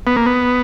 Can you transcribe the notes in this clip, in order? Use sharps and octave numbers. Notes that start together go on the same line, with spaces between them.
B3
A#3
B3